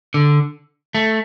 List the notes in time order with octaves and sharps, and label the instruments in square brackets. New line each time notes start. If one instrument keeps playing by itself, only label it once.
[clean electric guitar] D3
A3